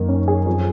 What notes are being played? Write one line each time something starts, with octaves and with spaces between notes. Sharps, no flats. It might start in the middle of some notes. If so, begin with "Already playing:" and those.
Already playing: F#2 D#3 A#3
C#4
G#4
F2